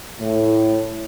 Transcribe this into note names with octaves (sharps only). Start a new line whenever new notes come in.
A2